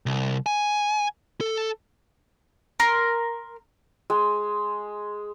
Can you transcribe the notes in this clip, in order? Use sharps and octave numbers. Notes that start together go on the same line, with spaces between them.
C2
G#5
A4
A#4 C6
G#3